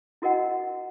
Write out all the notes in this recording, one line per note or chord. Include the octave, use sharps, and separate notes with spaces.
E4 F#4 A#4 D#5 F#5